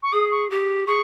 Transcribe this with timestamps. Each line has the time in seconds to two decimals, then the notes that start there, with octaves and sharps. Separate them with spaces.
0.03 C#6
0.12 G#4 D#6
0.31 C#6
0.50 G4
0.87 G#4 C#6